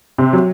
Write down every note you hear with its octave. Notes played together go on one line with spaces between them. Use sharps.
C3
F#3